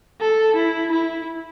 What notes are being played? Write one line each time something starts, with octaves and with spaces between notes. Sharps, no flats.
A4
E4
E4